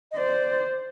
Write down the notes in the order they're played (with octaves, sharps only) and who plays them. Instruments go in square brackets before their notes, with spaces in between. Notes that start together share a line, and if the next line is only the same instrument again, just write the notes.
[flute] D#5
[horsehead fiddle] C5 [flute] D5